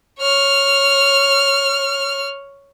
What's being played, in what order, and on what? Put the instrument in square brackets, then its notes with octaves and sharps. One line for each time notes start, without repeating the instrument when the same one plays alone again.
[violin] C#5 F6